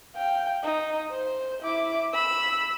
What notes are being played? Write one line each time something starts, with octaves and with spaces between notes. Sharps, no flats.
F5 G5
D#4
C5
E4 D6
B5 E6